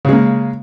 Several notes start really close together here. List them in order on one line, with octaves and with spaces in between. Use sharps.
C#3 G#3 A#3